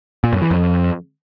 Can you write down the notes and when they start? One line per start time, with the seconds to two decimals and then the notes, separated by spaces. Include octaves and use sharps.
0.24 A#2
0.33 F#2
0.42 E3
0.51 F2